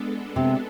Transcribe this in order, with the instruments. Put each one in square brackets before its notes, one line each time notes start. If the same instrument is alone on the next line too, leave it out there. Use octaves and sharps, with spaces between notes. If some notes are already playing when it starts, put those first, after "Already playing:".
Already playing: [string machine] G#3 B3 D4 A4
[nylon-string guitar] C3